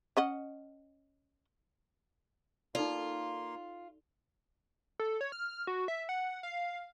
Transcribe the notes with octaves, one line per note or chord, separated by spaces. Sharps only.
C#4 D#5 F#5
A#3 D#4 F4 A4 D5 C6
A4
C#5
F6
F#4
E5
F#5
F5